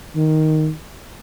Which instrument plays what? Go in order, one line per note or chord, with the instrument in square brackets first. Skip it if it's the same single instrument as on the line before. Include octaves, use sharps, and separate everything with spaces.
[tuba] D#3